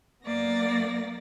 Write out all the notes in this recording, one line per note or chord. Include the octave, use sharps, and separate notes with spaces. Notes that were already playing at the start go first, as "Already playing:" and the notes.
F#2 A#3 B3 D5 A#6